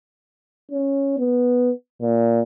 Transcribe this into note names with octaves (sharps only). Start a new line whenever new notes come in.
C#4
B3
A#2